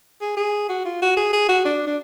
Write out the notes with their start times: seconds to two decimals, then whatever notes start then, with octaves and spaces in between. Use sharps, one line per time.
0.21 G#4
0.37 G#4
0.69 F#4
0.85 F4
1.02 F#4
1.17 G#4
1.33 G#4
1.49 F#4
1.65 D4
1.87 D4